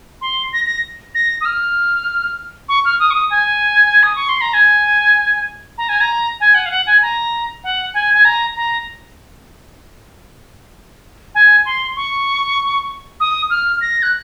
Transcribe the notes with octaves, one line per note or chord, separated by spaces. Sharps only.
C6
A#6
A#6
A#6
D#6
F6
C#6
F6
D#6
C#6
D#6
G#5
D#6
C#6
C6
A#5
G#5
A#5
G#5
A#5
G#5
F#5
F5
F#5
G#5
A#5
F#5
G#5
G#5
A#5
A#5
G#5
C6
C#6
D#6
F6
A#6
F#6